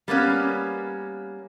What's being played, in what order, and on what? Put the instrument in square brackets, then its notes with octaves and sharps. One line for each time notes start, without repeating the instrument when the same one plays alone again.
[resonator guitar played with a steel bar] G3 A#3 B3 C#4